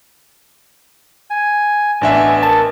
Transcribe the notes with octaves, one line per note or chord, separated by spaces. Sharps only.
G#5
A1 B3 D4 E5 G#5
A#4 A5